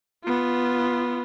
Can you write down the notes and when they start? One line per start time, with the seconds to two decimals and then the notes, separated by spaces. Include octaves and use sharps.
0.24 B3 F4